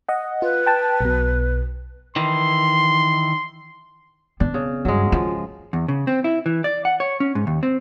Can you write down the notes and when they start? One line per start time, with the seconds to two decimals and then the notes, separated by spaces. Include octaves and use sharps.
0.09 D#5 F#5
0.42 F4 B4
0.66 G5 A5
1.01 B1 B2
2.16 D#3 E3 C6
4.40 B3 C4 D4
4.54 C#3
4.85 G2 F#3 G#3
5.12 F3 F4
5.73 E2
5.88 C#3
6.07 C4
6.24 E4
6.46 E3
6.64 D5
6.85 F#5
7.00 C#5
7.20 C#4
7.35 G#2
7.47 D#2
7.63 C4